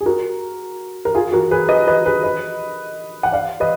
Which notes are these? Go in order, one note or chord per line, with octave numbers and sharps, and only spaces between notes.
G#4
F#4 A#4
A#4
F4 G#4
F#4 A#4
G#4 B4
B4 D#5
B4 D#5
G#4 B4
B4 D#5
F#5
D5 F5
B4 D#5